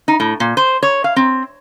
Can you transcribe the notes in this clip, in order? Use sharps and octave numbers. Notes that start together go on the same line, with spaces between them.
D#4
A2
A#2
C5
C#5
F5
C4